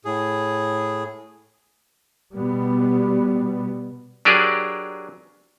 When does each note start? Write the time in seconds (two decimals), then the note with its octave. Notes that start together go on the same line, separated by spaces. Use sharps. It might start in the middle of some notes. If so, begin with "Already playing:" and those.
0.05 A2 G#4
2.35 B2 G3 B3
4.25 F#3 D4 G4 G#4 A#4 D5